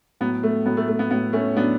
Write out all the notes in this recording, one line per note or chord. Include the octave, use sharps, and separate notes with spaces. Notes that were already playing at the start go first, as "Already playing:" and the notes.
A2 F#3 B3
A3
A2 F#3 B3
A3
A3
B3
A2 F#3 B3
A3 C#4
A2 F#3 B3 D4